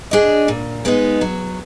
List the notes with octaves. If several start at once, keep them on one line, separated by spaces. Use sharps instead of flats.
D4 G#4 D#5
A#2
G#3 B3 D#4
F#3